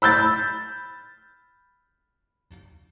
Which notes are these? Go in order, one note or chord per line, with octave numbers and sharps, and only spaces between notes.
B5 E6 G6 A6